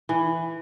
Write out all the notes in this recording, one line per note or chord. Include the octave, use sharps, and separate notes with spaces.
E3